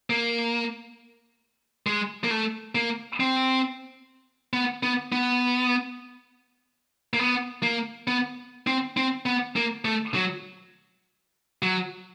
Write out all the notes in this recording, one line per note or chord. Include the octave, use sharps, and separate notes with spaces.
A#3
G#3
A#3
A3
A#3
C4
B3
B3
B3
A#3
B3
A#3
B3
C4
C4
B3
A#3
A3
F#3
F#3